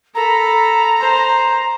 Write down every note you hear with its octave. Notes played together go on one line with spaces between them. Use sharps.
A4 A#5 B5
C5